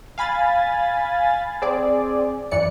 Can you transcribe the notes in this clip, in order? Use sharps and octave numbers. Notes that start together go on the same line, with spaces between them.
F5 G#5 B5 A6
C4 G#4 D5
F#2 E3 D5 C#7